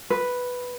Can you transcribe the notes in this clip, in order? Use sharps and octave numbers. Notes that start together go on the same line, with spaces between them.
B4